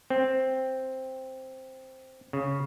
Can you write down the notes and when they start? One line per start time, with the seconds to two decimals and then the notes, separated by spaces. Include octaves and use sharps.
0.10 C4
2.33 C#3